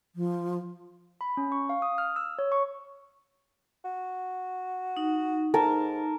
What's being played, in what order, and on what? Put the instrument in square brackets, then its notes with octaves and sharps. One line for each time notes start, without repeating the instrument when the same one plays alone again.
[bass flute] F3
[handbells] B5
C#4
C#6
F5
D#6
F6
E6
C#5
C#6
[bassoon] F#4
[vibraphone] D#4
[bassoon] G#2 [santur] A#4 A5